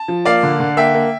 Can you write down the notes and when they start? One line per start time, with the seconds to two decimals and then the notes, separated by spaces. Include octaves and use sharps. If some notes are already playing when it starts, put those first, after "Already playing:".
Already playing: A5
0.08 F3
0.25 A#3 D5 F5
0.43 D3
0.60 D3
0.77 A#3 E5 G5
0.94 A#3